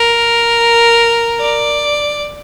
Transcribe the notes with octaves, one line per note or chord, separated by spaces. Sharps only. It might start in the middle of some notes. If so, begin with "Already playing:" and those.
Already playing: A#4
D5